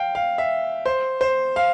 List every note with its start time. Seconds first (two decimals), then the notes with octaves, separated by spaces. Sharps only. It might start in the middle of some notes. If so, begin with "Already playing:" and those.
Already playing: F5 G5
0.15 F5
0.38 E5
0.86 C5
1.21 C5
1.56 F5